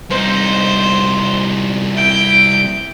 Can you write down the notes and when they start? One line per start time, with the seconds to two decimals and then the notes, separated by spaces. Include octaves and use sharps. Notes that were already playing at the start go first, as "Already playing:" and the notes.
0.10 C2 D#4 C5
1.93 E4 G5